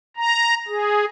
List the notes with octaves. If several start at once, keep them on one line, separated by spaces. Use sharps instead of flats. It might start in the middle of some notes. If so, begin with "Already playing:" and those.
A#5
G#4